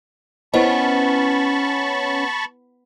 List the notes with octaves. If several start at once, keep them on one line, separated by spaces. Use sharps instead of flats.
B3 C#4 E4 C5 D#5 A5 B5 C#6